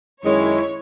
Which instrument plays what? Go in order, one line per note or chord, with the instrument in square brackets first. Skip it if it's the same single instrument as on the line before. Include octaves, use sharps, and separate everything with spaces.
[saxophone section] F#2 D#3 G#3 [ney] E4 [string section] C#5